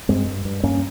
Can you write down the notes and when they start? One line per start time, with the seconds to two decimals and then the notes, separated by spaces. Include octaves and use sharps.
0.09 G2 G#3 C4
0.27 G2
0.45 G2
0.63 G2 A#3 C#4